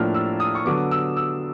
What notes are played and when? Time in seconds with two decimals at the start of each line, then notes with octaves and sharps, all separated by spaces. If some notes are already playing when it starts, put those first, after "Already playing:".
Already playing: A2 F3 A#3 D4 F4 F6
0.14 E6
0.40 D#6
0.55 C#6
0.65 D3 F#3 B3 D6
0.91 E6
1.17 E6